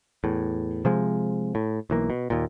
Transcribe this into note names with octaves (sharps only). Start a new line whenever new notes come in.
E2 A2
C3 F3 G#3
A2
B1 E3 A#3
B2
D#2 A#2